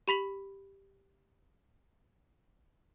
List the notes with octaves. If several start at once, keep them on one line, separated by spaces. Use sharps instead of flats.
G4 B5 B6 F#7